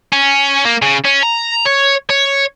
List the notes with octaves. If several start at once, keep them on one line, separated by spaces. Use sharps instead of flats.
C#4
A#3
C#3
C#4
A#5
C#5
C#5